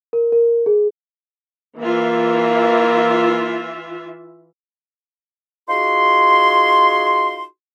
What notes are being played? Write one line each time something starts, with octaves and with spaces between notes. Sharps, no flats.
A#4
A#4
G#4
E3 A#3 F4 E5
D#4 F4 F#4 G#4 C6